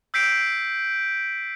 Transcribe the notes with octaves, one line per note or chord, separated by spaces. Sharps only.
E6 G6 B6 C7 D7